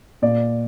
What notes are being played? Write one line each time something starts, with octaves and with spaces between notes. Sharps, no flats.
A#2 D5